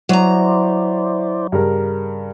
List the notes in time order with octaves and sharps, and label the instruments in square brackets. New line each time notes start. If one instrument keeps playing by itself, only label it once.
[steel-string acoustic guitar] F#3 A#5 [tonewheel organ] E4 C5 D5
[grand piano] G2 C#3 A#4